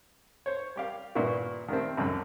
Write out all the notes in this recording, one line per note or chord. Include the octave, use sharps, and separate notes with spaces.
C5 C#5
G3 G4 F5
G2 A#2 D#3 B3 E4 F#4
D#3 G3 A3 C4
G#1 C#2 F#2 A4 B5